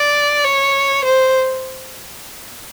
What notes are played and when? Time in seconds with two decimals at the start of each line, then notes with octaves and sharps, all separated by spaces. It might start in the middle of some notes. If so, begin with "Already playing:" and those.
Already playing: D5
0.45 C#5
1.04 C5